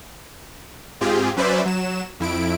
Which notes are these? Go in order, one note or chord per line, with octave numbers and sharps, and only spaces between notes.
G#2 C4 F4 G4 G#4
F#3 C#4 B4 C5 D5 E5
F#3 E7
F2 E4 D7